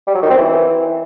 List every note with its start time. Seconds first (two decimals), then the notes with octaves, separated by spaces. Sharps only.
0.07 G3
0.15 F#3
0.22 D#3
0.30 C4
0.37 E3